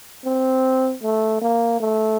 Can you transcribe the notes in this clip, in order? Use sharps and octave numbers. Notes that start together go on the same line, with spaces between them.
C4
A3
A#3
A3